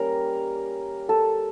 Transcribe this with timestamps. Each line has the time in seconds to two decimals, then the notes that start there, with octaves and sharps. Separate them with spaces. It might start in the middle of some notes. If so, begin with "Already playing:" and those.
Already playing: G3 A#3 C#4 A#4
1.09 A4